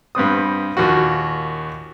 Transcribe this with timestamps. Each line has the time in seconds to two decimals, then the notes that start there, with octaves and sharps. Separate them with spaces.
0.15 G2 B3 C4 D#6
0.77 D#2 A#2 A#3 F#4